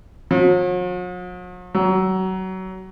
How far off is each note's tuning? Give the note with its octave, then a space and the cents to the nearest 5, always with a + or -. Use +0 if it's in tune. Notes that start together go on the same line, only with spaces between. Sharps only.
F#3 -45
F#3 +25